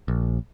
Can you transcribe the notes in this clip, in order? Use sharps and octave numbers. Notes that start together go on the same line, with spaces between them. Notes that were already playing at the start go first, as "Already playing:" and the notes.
A#1